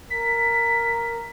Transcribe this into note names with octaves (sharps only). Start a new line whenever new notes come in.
A#4 B6